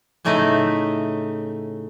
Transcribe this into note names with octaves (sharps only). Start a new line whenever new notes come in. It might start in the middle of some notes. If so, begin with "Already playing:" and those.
A2 C#3 A3 D#4 D#5 E5